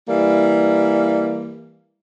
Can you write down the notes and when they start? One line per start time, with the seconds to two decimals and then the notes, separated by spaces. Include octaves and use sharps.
0.08 E3 G3 A#3